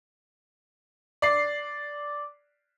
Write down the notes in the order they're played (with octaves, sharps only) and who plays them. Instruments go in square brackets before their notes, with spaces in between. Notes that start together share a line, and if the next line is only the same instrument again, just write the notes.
[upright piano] D5 C7